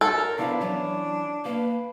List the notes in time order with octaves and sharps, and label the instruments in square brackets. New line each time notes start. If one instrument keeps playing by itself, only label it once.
[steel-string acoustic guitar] F#2 [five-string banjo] A4
[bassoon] A#4
[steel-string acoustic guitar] F3 B3 E4 [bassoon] D4 [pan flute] F5
[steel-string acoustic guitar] E3 C#4 [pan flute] F#3
[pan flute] A#3 [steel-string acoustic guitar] B4 F5